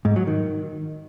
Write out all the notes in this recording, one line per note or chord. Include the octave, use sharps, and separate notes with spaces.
G#2
F#3
D#3